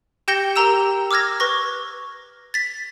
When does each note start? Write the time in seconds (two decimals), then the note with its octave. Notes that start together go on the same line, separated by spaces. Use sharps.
0.28 G4 G5 G6 A#6 C#7 G7
0.56 G4 A#4 G5 A#5 E6 E7
1.11 D6 E6 F6 G#6 A#6
1.40 B4 C#6 A#6
2.54 A6 B6